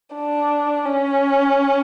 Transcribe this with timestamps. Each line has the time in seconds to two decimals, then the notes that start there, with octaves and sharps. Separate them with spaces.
0.15 D4
0.85 C#4